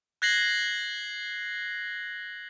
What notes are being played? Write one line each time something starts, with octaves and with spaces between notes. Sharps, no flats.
F#6 G#6 A#6 C7 F#7